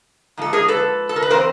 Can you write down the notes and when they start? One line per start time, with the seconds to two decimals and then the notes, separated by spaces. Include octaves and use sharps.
0.37 G#2 F3 A#3 A4
0.53 G#4 A#4
0.68 A4 B4
1.09 A4
1.16 A#4
1.22 B4
1.30 C#3 E3 C4 A#4 C5